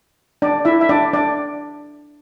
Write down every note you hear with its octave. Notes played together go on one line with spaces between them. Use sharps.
D4 D5
E4 E5
E5
D4 D5
D4 D5